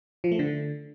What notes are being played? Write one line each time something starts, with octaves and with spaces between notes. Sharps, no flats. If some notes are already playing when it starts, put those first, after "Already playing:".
F3
A3
D3